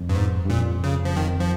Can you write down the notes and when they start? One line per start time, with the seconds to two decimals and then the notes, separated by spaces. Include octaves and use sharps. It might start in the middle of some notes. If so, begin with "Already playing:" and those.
Already playing: F2
0.09 G2
0.15 G#2
0.45 G2
0.49 F2 A#2
0.84 C#3
1.05 F3
1.16 F2 D#3
1.40 F3